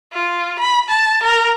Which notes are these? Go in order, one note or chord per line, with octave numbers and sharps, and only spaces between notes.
F4
B5
A5
A#4